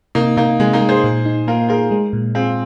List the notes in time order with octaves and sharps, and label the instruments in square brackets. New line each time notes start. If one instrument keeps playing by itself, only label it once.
[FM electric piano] C3 [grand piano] A#3 D#4
[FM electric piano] C3 [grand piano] A#3 D#4
[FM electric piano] C3 [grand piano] G#3
[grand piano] A#3 D#4
[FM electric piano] G#3
[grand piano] G#4 C5
[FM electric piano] A#2
D#4
[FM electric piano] A#3 [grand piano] F4 A#4
[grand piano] F4 A#4 [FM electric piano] G#4
[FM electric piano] G#3
A#2
[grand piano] C4 F4 [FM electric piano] G#4